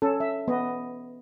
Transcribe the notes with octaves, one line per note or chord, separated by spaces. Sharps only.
C#4 A4
E5
B3 D#5